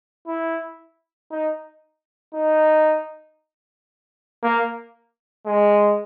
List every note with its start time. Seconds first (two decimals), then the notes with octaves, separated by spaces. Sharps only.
0.27 E4
1.31 D#4
2.34 D#4
4.43 A#3
5.46 G#3